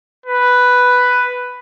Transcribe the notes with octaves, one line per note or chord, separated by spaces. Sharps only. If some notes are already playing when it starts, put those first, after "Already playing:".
B4